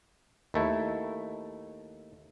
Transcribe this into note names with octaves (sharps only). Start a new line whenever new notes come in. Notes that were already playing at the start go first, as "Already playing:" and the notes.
D#2 A3 E4